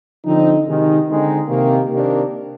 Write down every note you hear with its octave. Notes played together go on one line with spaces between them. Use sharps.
D3 F3 C4 D#4
C3 D#3 G#3 D#4
D3 G#3 C4 D#4
C3 D#3 A#3
C3 D#3 A#3 D4